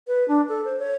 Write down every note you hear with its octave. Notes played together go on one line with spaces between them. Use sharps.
B4
D4
A4
C5
C#5